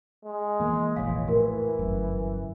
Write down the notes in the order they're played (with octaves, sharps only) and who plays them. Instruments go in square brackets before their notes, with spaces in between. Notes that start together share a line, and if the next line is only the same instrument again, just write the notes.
[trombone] G#3
[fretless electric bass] E3 A#3
[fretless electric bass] F1 A#1 E3 [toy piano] C#5 F5
[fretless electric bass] A2 [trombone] E3 [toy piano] F#4 A#4
[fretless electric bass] G1 F#2